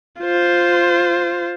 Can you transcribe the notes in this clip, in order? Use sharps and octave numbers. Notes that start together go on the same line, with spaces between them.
F4 C5